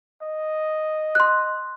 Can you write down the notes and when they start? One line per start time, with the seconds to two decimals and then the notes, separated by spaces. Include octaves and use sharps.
0.22 D#5
1.15 C6 F#6